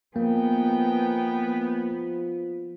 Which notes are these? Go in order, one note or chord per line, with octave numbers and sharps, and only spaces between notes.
F3 A#3 B3 D#4 G#4 G5